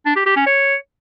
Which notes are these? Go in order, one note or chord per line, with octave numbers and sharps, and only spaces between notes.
D4
G4
G4
C#4
C#5